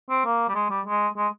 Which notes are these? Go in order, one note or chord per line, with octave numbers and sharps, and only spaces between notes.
C4
A#3
G3
G#3
G3
G#3
G#3